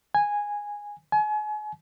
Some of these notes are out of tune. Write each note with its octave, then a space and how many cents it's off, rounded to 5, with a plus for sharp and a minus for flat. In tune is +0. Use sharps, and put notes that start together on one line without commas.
G#5 -10
G#5 +35